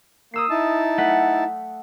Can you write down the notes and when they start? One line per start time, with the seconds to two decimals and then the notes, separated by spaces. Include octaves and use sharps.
0.34 A#3 D#6 E6 C7
0.50 D#4 E4 A5
0.98 A3 F#5 B6